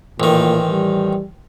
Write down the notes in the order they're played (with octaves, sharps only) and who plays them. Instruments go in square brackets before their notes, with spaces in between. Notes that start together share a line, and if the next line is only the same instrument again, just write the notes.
[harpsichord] A1 D#3 [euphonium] A#2
[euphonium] G3